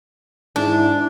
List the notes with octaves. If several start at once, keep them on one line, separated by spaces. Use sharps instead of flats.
G#2 D4 E4